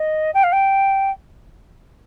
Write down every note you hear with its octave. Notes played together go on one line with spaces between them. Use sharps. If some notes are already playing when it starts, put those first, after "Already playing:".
Already playing: D#5
G5
F5
G5